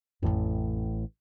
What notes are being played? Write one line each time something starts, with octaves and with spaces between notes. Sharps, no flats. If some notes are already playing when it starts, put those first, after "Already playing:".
A1 F2 A2 C#4